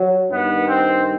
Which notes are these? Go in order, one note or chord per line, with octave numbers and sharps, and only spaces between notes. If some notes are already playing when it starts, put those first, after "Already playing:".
Already playing: F#3
G2 D#3 B3
C4